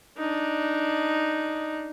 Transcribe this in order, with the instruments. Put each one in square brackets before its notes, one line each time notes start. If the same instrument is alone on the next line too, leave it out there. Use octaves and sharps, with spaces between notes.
[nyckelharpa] D4 D#4